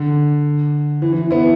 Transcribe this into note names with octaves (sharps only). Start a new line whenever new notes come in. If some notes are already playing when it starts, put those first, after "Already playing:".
Already playing: D3
E3
E3
B3 E4